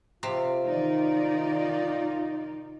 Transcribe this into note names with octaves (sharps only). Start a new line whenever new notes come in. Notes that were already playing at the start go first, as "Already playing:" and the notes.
C3 F4
D#3 D#4 D5